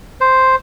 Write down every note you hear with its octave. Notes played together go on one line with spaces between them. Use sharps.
C5